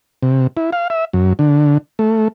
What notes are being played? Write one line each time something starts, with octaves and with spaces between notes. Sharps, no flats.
C3
E4
F5
E5
F#2
D3
A3